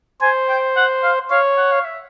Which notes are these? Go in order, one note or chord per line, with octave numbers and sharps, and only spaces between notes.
C5 G#5
G5
F#5
F5
C#5 F5
F#5
F5
E5